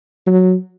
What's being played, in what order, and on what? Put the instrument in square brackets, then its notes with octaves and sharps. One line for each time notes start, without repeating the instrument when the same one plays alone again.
[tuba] F#3